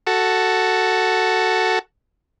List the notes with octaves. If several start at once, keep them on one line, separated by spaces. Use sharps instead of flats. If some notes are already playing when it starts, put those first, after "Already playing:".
F#4 A4